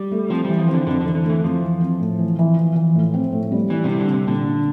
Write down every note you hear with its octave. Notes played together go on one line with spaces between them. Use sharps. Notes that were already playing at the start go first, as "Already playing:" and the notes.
Already playing: G3
A3
F3 C4
E3 G3
F3
C4
D3
F2 D3
D3 E3
D3
E3 A3
F2 F3
E3
C4
A2
E3
E3
E3
E3
A2
C4
A2
G3
E3 G3
C3 G3
D3
C3 G3
A#2 D3
D4